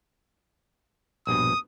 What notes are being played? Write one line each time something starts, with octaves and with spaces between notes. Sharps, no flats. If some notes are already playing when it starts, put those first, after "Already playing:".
A#1 G2 B2 D#6